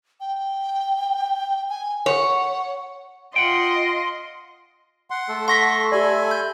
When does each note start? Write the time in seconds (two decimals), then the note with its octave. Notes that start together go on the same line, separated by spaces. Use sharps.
0.21 G5
1.70 G#5
2.06 C#5 F#5
3.36 F4 D#5 F#5 G5 C6
5.10 F#5 C6
5.29 A3 A4
5.48 F#5 C6 C#6 A#6 B6
5.92 G4 D5 E5 G#5 B5
6.31 G6